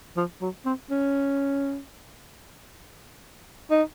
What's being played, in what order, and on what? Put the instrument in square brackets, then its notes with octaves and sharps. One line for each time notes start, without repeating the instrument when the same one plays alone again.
[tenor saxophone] F3
F#3
C4
C#4
D#4